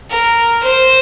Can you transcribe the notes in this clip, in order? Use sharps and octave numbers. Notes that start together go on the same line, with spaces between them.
A#4
C5